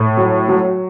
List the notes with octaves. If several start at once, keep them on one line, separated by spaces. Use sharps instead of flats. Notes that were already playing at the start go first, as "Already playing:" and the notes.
Already playing: A2
F#3
F#3